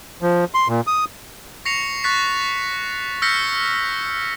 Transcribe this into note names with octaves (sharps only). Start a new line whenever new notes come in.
F3
C6
A#2
D#6
C#6 A#6 C7 C#7 F7
C#6 F#6 A6 B6
E6 F6 G6 A#6 B6 C#7